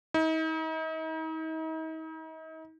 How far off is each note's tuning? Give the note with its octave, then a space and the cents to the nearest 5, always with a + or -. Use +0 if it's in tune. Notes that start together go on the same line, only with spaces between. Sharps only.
D#4 +40